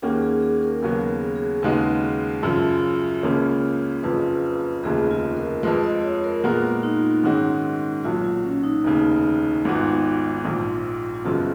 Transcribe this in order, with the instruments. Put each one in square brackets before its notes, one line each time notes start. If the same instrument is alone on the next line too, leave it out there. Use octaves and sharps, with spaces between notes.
[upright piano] D#2 D#3 A#3 C#4 F#4 [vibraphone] G#4
[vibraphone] G#4
G#4
A#4
[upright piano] D#2 C#3 F#3 B3 F#4 [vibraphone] A#4
[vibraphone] G#4
G#4
[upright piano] D#2 C#3 G#3 D#4 F#4 [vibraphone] B4
[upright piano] F#2 C#3 F3
C#2 C#3 F3 A#3 C#4
[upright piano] F#1 F2 C#3 F3 [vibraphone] B4
[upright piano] F1 D#2 C#3 F3 [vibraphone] G#4
[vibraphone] F4
A#4
[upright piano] F2 F3 G#3 [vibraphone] B4
[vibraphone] D#5
C#5
A#4
[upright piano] A#2 G#3 B3 F#4 A#4 [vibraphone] F4
[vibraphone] D#4
[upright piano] G#2 D#3 G#3 C#4 F#4
[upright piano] B1 A#2 F#3 [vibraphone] F4
[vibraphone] F4
C#4
D#4
[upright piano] F1 D#2 C#3
G#1 G#2 F3 B3 F#4
[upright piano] A#1 G#2 F3 [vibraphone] F4
[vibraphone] F4
[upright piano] F#1 F#2 C#3 F3 B3 [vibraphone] F#4